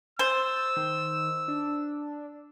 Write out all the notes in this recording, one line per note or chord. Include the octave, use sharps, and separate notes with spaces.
C5 E6 A6
D#3
D4